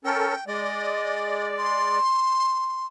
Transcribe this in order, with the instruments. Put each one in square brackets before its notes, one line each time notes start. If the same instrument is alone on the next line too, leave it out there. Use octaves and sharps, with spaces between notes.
[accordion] C#4 A4 A#4 [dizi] G5
[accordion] G#3 D5 [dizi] D#5
[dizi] C6